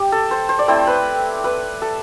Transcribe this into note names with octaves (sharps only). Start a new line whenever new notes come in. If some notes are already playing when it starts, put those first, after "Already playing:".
Already playing: G4
A4
C5
C5
D5
A3 C4 E4 C5
B4
B4
A4